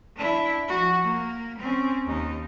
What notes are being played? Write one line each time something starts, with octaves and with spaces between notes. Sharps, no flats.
D4 E4
F3 F#4
A#3
C4 C#4
D#2 D#4